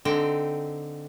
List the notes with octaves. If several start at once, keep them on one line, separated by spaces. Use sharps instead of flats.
D3 C4 D#4 G5